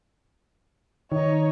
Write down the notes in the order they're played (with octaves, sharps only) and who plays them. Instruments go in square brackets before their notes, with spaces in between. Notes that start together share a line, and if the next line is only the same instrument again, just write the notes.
[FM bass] D#3 [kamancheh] D#4 C#5